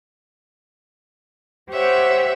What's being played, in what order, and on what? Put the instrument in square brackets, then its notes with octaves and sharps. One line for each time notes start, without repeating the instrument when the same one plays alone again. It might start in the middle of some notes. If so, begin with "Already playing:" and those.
[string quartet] G4 C5 C#5 E5 F#5